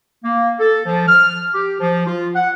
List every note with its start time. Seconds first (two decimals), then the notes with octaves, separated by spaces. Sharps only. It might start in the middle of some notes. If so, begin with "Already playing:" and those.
0.24 A#3
0.59 A4
0.86 F3
1.08 F6
1.53 G4
1.80 F3
2.07 F4
2.36 F#5